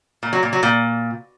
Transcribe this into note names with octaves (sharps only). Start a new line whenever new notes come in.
A#2
F#3
A#2
F#3
A#2